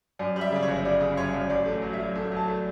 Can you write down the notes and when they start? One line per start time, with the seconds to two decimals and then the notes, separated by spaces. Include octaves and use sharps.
0.19 F#2 D5
0.36 G3
0.41 E5
0.52 C#3 D5
0.63 C#5
0.68 G1
0.85 G3 D5
1.01 C#3
1.17 F#2 C#5
1.34 F#2
1.50 A1 D5
1.66 A3
1.82 F#3
1.93 E5
1.99 F#3
2.16 A3
2.32 F#3 A5
2.48 A3